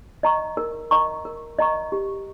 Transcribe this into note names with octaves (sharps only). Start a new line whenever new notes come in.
D#5 A#5 C#6
A#4
D#5 A#5 C#6
A#4
D#5 A#5 C#6
G4